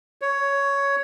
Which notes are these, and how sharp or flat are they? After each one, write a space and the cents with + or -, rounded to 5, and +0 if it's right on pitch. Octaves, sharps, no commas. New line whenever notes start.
C#5 +10